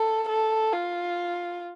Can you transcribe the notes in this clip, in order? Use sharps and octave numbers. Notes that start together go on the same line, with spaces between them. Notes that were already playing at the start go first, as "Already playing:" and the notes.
Already playing: A4
A4
F4